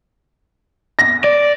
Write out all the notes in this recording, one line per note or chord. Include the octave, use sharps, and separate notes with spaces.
A#6
D5